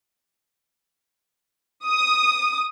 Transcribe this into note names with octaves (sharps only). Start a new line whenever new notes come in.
D#6